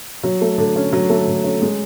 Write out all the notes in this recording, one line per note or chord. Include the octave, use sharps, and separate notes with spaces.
F#3
A3
D3
C#4
F#3
A3
D3
C#4
G#3